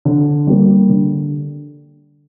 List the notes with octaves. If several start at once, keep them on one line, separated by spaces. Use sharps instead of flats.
D3
G3 A#3
D3